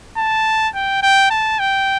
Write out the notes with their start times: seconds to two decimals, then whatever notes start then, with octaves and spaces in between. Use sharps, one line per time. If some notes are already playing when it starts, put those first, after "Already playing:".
0.17 A5
0.75 G5
1.03 G5
1.30 A5
1.59 G5